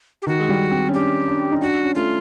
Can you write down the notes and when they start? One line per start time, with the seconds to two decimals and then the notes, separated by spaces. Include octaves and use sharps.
0.22 G4
0.27 D#3 F#4
0.39 G#3
0.49 G3
0.71 C4
0.88 C#4
0.94 D4 G4
1.28 D4
1.52 D#4
1.61 D4 F#4
1.84 C#4
1.95 A3 F4